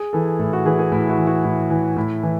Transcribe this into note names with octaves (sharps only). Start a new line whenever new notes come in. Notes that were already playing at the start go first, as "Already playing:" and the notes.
Already playing: G#4
E3 A4
A2 A4
F#4
E3 G#4
G#4
A2 E4
F#4
E3
F#4
A2 E4
E3
A2 E4
E3